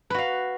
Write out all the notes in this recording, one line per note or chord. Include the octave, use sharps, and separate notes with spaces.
F#4 B4 F5